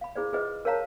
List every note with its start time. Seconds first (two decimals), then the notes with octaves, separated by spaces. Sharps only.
0.01 F5 B5
0.16 E4 G#4 C5 D5
0.33 F4 G#4 B4 C5 D#5
0.65 A#4 C5 C#5 F5 A5 A#5